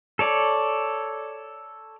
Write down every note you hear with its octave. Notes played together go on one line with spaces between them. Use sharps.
A4 C#5 D5